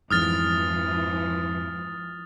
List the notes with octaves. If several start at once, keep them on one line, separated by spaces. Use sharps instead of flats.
F2 G#2 E3 F3 D#6 F6 A6